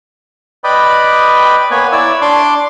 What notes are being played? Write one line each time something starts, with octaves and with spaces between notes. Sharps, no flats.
B4 D5 D#5 G5 B5
A#3 B3 B4 C#5 G#5
E4 C#5 D5 E6
D4 C6 D6